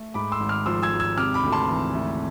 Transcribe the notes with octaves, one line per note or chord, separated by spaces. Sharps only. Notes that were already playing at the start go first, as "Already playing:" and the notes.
Already playing: A3
G#2 B5 D6
C6 E6
G#1
D6 F6
F3 C6 E6
E6 G#6
G#1
E6 G#6
C3 D6 F6
B5 D6
D2
A5 C6
E3
A3